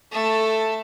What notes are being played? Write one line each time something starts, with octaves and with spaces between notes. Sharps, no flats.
A3 A4